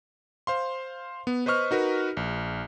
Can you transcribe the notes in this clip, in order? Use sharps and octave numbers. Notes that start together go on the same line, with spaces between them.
C5 F5 C6
B3
B4 C5 D#5 C#6 F6
D#4 F#4 A#4 B4
A#1